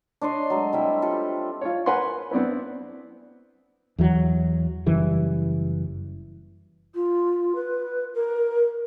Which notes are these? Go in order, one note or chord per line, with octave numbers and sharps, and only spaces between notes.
D4 C#5 D#5 C6
F#3 G#3 A3
G3 C4 E4
F4 G4 A4
F4 C#5
A#4 B4 F#5 G#5 C6
B3 C4 D4 E4 B4
E2 E3 F#3
F#1 F#2 E3 G3
F4
B4
A#4